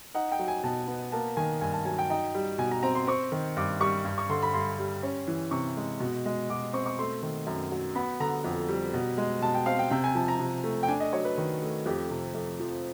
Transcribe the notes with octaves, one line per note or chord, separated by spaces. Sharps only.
D#4 F#5
G5
F#3
G#5
B2 A5
B3
A#3 A5
D#3 G#5
G2 G#5
A5
F#3 G#5
G5
D#4 G5
G3
B2 G#5
A#5
C4 A#5
C6
C4 C#6
D#3
G2 D6
G3 C#6
G2
C#6
D3 C6
B5
G2 C6
G3
C#4
E3
C3 C#6
G#3
B2
G#3
B2 D6
C4 C#6
C#6
A3 C6
D#3
F#2
F#3
B3 B5
D3 A#5
F2
G3
B2
G#3
B2 A5
G5
C4 F5
G5
C3 G5
G#5
F3 A5
A#5
C3
A3
G5
D4 G#5
D#5
F#3 C#5
B4
D#3
A3
F2 G4
C3
F2
F3